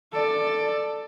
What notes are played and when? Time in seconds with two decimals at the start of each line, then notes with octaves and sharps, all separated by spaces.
0.12 A4 D5